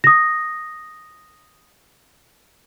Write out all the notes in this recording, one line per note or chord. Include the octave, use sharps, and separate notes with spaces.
D#6 A#6